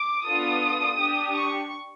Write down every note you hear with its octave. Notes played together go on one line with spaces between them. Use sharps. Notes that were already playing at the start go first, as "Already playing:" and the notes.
Already playing: D6
B3 D4 F4 A4 D#6
D4 G4
C#6